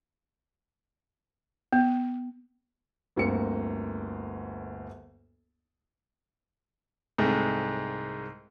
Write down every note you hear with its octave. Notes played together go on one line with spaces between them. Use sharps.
B3
G1 D2 A#3 C4 C#7
C2 G#2 G#3 A3